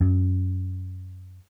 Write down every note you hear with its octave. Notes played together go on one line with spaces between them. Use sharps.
F#2